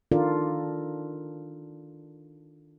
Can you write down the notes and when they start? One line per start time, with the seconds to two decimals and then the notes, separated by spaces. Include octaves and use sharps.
0.12 D#3 D4 F4 A4 A#4 D5